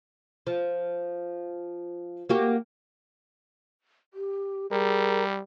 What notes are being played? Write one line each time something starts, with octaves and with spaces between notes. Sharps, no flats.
F3
A#3 F#4 G4
G4
G3 G#4 A#4